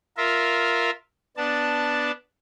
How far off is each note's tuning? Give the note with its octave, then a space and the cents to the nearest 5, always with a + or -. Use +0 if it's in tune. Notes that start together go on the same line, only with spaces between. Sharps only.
F4 +0 A#4 +0 E5 -10
B3 +0 D4 +0 A5 +0